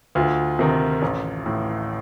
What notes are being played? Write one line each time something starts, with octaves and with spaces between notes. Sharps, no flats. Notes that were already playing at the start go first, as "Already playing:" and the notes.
D2 F4
C3 D#3
A1
A2